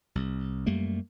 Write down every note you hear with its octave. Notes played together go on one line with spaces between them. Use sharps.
C2
F#2 G3 A3 A#3